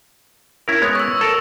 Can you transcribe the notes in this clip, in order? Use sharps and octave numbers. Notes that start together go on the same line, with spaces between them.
C#4 E4 A#4
G#3 B3 C#5
C#6 E6
A4 A#4